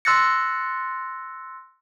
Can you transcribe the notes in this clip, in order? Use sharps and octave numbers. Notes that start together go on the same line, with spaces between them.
C6 E6 F#6 A6 A#6 C#7